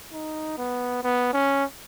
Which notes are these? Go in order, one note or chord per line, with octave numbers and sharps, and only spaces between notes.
D#4
B3
B3
C#4